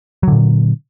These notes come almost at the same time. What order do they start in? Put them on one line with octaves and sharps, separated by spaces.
F#3 D3 A#2